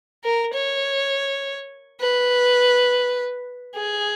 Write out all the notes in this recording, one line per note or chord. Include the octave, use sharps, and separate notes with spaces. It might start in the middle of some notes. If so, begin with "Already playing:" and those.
A#4
C#5
B4
G#4